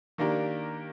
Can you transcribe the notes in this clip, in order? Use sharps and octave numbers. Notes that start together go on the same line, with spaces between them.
D#3 A#3 D4 G4 A#4